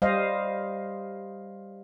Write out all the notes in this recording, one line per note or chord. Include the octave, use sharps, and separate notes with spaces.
G3 C5 D#5 F5